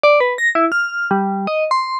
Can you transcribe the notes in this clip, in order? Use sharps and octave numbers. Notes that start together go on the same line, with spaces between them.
D5
B4
A#6
E4
F6
G3
D#5
C6